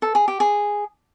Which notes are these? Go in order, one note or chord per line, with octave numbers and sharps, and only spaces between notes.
A4
G#4
G4
G#4